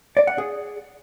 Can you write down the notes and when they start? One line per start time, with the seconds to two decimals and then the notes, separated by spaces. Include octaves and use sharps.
0.17 D5
0.27 F#5
0.38 G#4